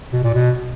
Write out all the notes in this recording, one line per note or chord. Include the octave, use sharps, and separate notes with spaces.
B2
A#2
B2